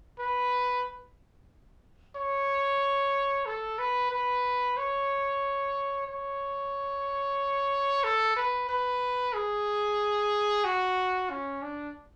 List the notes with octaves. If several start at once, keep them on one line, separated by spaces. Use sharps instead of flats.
B4
C#5
A4
B4
B4
C#5
C#5
A4
B4
B4
G#4
F#4
C#4
D4